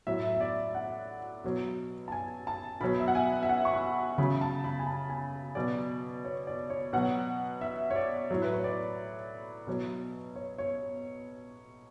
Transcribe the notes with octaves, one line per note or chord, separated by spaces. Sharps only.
A2 F#3 E5
E5
D5
E5
F#5
B2 F#3
A5
G#5
A5
B2 F#3 B5
E5
F#5
G#5
E5
F#5
C#6
B5
C#3 F#3 B5
A5
B5
G#5
A5
G#5
B2 F#3 D5
C#5
D5
C#5
B2 F#3 F#5
E5
C#5
D5
A2 F#3
B4
C#5
D5
B2 F#3
C#5
C#5